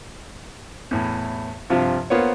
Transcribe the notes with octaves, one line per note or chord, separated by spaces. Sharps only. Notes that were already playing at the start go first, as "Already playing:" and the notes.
E2 A2
G2 C3 F3 F4
A#3 B3 F4 C5 C#5